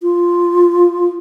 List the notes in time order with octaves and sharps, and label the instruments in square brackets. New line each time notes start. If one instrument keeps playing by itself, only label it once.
[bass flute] F4